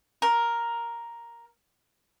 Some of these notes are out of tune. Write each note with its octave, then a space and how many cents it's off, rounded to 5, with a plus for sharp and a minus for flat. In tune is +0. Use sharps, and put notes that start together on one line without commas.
A#4 +5